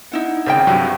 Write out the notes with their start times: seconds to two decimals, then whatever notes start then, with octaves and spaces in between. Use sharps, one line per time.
0.12 D#4 E4 F#5
0.46 G#1 C#3 C5 E5 G5
0.67 G2 C3 F#3